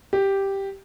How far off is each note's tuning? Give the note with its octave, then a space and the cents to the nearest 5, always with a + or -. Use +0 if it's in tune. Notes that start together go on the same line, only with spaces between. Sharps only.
G4 +0